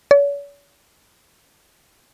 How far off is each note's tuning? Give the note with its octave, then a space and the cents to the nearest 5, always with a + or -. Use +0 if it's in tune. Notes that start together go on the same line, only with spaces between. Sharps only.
C#5 +45